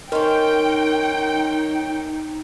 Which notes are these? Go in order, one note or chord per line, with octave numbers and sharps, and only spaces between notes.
D#3 C#4 D#4 A#4 G5 C6